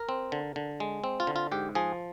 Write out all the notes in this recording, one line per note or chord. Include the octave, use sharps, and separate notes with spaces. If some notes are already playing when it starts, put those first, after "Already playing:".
Already playing: A#4
C4
D3
D3
G#3
C4
F4
D3
F4
G#2 G4
F3 G#4